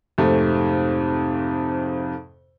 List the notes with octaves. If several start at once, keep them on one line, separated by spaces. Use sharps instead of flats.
F2 G#2 C3 A3